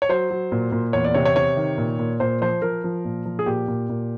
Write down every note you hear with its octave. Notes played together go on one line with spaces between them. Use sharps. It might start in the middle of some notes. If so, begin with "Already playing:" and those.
C#5
F#3 C5
F#3
A#2
A#2
E2 C#5
D5
C3 C#5
C#5
C3 C#5
D#3
A#2
A#2
A#2 C5
F3 C5
F3 A#4
F3
A#2
F3
G#4
A#2 G4
A#2
A#2